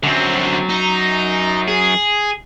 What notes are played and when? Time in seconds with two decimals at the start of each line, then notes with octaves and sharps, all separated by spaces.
0.03 F#2 D3 F#3 C4
0.69 D#4
1.68 G#4